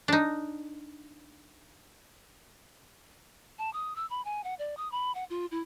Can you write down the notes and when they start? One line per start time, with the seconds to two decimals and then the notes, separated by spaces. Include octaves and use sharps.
0.08 D4 D#4
3.59 A5
3.73 D#6
3.96 E6
4.10 B5
4.25 G#5
4.44 F#5
4.59 D5
4.77 D#6
4.92 B5
5.15 F#5
5.30 F4
5.51 E4